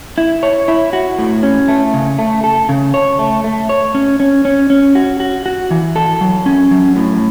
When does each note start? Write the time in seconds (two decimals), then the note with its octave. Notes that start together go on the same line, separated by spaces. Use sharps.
0.18 E4
0.43 C#5
0.68 E4
0.93 F#4
1.18 A2
1.43 C#4
1.68 A3
1.94 C#3
2.19 A3
2.44 A4
2.69 C#3
2.94 C#5
3.19 A3
3.44 A3
3.69 C#5
3.95 C#4
4.20 C#4
4.45 C#4
4.70 C#4
4.95 F#4
5.20 F#4
5.46 F#4
5.71 E3
5.96 A4
6.21 F#3
6.46 C#4
6.71 F#3
6.96 A2